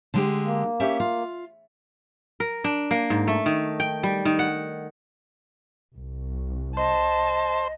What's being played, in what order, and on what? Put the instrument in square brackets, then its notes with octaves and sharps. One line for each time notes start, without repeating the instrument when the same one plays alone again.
[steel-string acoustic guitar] D3 G#3 G4
[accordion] A#3
[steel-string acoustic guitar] C#4 G4 E5
F4
[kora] A#4
D4
A#3
G#2
A3
D#3
G5
G3
D#3
F#5
[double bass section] C2
[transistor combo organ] C5 [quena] D#5 [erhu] A5